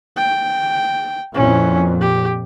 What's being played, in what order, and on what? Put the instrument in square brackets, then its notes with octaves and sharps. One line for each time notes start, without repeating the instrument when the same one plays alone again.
[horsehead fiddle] G5
[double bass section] F2 A#2 [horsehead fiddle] C#4 E4
[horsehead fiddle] G4